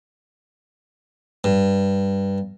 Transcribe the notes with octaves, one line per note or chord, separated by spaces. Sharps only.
G2